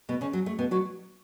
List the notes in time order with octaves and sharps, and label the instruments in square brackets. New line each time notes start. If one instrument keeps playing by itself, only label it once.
[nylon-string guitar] B2 B3
C#3 C#4
F#3
A3
B2 B3
F#3 F#4